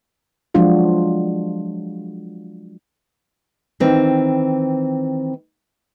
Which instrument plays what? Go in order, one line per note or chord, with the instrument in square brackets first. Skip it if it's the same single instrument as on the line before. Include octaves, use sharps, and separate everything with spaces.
[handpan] F3 F#3 G#3 D4 F4 F#4
[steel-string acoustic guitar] D#3 E3 C4